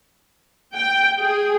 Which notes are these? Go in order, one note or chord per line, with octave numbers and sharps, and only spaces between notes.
G5
G#4